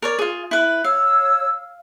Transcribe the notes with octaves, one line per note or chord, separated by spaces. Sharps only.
A#4 C#5 D5
F4 G#4
E4 B4
C#5 F5 E6